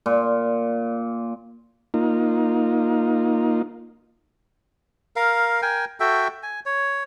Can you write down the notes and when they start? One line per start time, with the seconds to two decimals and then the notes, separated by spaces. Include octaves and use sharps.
0.06 A#2
1.94 A#3 D#4 F4
5.16 A#4 F5
5.62 A#4 G5 G#5
6.00 F#4 A4 E5 G5
6.43 G#5
6.66 C#5